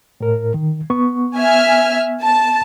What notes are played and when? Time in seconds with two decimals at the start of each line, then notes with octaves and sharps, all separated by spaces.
0.21 A2 A#4
0.54 D#3
0.90 B3 C#6
1.38 E5 G#5 F6
2.22 A5